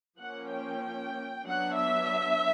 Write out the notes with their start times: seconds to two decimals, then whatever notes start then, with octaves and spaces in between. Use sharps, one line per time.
0.19 F3 A#3 C#4 F#5
0.52 G5
1.46 F#3 B3 D4 F#5
1.77 E5